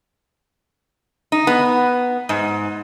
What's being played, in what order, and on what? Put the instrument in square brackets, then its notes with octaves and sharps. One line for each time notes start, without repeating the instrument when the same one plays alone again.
[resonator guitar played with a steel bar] D#4
B3
G#2